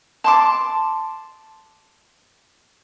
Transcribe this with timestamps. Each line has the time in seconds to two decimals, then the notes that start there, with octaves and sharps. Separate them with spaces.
0.24 A5 C6 D6